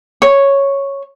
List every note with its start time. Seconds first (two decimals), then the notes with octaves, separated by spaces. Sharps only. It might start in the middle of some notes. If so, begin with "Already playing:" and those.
0.22 C#5